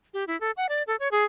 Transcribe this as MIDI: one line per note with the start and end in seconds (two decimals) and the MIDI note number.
0.14 0.24 67
0.27 0.39 64
0.41 0.51 69
0.57 0.67 78
0.69 0.83 74
0.87 0.96 69
1.00 1.08 73
1.11 1.24 68